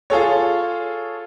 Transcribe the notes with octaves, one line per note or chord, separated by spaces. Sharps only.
F4 G#4 A4 C#5